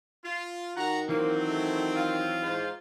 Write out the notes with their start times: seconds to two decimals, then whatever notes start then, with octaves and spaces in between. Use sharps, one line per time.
0.23 F4
0.76 D#3 F#4 F#5 A#5
1.09 E3 F#3 A#3 C4 D#4
1.46 A3
1.96 F4
2.43 G#3 C5